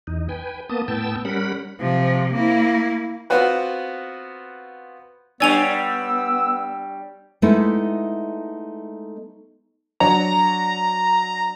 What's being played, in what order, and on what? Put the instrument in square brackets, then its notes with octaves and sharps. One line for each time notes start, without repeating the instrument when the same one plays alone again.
[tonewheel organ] E2 D#4
B4 G5 G#5
A#3 B3 A5 D#6
A2 B3 G5 A5 E6
G3 C#4 A#4 F#5 B5
[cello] C3 F3
A#3 E4
[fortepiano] B3 C4 F4 F#4 B4
[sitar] G3 D4 C#5 [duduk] B3 [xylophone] D5 G#5 F7 [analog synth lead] E6
[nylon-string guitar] G#3 A3 B3 D#4 E4 A4
[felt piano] F#3 D4 C#5 [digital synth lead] A#5